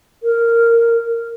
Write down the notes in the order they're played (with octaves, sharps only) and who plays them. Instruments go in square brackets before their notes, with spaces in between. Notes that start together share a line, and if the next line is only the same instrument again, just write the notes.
[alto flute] A#4